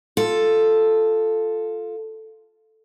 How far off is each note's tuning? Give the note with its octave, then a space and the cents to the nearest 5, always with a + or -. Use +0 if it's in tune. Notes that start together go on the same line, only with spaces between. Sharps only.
F4 +0 A4 +0